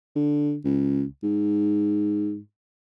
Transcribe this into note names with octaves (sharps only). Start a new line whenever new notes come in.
D3
C#2
G#2